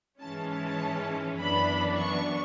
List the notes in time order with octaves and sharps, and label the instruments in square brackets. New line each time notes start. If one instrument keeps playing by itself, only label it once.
[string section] G#2 E3 G#3 C#4 A5
A5
F#2 E3 B3 D4 B5
C#6